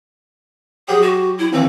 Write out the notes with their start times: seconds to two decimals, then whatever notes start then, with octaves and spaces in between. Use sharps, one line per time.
0.88 F#3 G4 G#4
1.02 F#4
1.38 E4
1.53 D#2 E3 C4